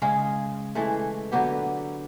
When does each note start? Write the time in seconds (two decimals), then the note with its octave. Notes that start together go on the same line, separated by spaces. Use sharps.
0.02 C#3 G#3 G#4
0.75 E3 G#3 A3
1.32 D3 F#3 B3 G4